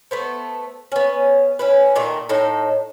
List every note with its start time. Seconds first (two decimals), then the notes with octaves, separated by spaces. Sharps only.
0.11 A3 B3 C5
0.92 B3 C#4
1.59 C#4 E4 B4
1.96 A#2 D#3 A3
2.29 A2 D#4 A4 G5